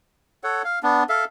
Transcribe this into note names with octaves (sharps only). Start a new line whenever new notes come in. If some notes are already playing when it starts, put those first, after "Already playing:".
A4 C#5 F#5
F5
B3 D4
A4 E5 F5